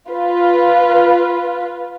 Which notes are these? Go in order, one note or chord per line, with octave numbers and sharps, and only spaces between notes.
F4 B4